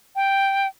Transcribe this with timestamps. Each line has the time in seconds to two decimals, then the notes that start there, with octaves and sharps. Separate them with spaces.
0.16 G5